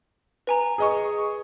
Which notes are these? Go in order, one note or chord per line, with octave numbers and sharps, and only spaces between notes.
B4 G#5 A#5
G#4 D#5 C#6